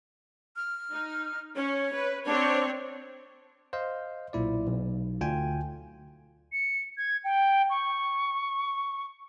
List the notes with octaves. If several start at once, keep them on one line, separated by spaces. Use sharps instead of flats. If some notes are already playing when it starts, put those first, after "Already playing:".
F6
D#4
C#4 C#5
B4
C4 D4 C#5
C5 D#5 F5
B1 A#2 E4 D5
B1
D2 F4 G5 G#5
C#7
G#6
G5
C#6